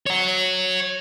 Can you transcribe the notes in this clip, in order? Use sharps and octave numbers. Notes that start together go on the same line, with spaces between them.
C#5 F#5